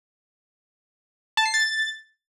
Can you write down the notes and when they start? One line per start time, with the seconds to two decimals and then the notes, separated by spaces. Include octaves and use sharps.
1.37 A5
1.46 C7
1.54 A6